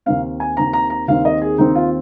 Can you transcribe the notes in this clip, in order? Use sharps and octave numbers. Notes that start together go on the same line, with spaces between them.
D#2 D#3 C4 F5
G#5
D#2 D#3 C4 A#5
A#5
A#5
D#2 D#3 C4 F5
D#5
G#4
D#2 D#3 C4 D#4
F4